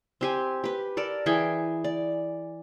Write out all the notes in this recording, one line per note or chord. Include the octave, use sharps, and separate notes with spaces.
C4 G4 G#5
G4 B4
A4 A#4 D5
E3 G#4 G5 G#5
D5